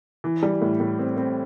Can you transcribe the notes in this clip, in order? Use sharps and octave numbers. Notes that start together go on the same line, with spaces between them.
E3
G3
A2
A2
C4
C4